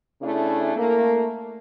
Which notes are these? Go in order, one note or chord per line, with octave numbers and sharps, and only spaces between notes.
C#3 A3 D4 E4 G#4
A3 A#3